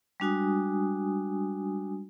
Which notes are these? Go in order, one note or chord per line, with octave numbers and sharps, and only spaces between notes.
G3 G#3 D4 F#4 G#5 D#6